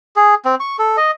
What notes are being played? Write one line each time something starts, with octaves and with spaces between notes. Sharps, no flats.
G#4
C4
C#6
A4
D#5